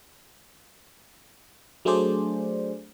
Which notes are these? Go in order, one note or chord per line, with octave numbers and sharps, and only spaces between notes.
F#3 A3 D4 G#4 C5 D5